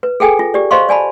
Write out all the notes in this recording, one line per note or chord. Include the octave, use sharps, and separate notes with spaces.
B4
G#4 A4 G5 G#5
F4
G4 D5
C5 D#5 F5 C6 C#6
D5 G#5 A5 B5